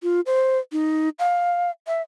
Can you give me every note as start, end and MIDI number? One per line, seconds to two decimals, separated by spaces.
0.03 0.20 65
0.26 0.59 72
0.72 1.09 63
1.19 1.71 77
1.87 2.02 76